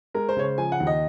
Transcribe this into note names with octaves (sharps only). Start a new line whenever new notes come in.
G#3 A#4
C5
C#3 C#5
C5
F3 G#5
F#5
D#2
D#5